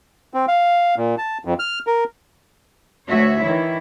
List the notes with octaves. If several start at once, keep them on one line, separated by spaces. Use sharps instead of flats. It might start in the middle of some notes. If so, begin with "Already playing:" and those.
C4
F5
A#2
A5
F2
F6
A#4
D2 A3 F#4 C#5 E5
D#3 E3 E4